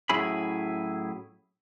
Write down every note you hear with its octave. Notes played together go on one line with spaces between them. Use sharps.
A2 F#3 C#4 E4 G#4 B5